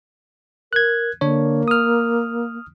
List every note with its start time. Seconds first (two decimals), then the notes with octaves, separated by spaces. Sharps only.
0.73 A#4 F#6 G#6
1.21 D3 A#3 D4 C#5
1.68 D#6 F6